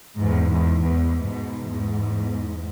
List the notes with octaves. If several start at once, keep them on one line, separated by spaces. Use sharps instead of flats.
E2 G#2
E2 G#2
E2 G#2
G#2 B2
E2 G#2